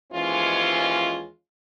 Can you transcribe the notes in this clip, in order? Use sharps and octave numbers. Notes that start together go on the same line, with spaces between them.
D#2 E3 F3 G#3 C#4 F4